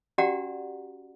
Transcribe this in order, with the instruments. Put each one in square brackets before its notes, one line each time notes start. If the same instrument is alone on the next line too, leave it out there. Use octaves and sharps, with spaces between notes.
[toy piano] C#4 F#4 G4 D5 F#5 A#5